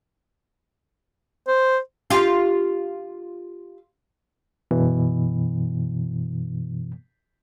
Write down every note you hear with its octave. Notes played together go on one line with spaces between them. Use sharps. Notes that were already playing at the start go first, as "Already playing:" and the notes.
C5
F4 G4
F#2 B2 E3